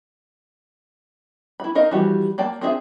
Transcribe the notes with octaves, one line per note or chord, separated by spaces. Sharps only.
E4 B5
D#4 A#4 D#5 F5
E3 F3 G3 F#4 G4
A#3 D5 G5 A5
C4 D4 F4 G#4 E5